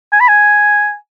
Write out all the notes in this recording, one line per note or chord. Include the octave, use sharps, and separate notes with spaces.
G#5
B5
G#5